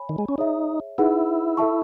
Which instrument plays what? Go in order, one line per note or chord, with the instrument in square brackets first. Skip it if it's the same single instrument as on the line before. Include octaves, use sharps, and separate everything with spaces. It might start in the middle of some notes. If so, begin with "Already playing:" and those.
Already playing: [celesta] C#5 G#5 B5
[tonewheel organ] D#3
G#3
C#4
[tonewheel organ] D#4 [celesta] G#4 C#5 E5
[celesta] D#4 G#4 B4 F#5 [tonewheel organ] E4
[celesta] A4 E5 A5 C#6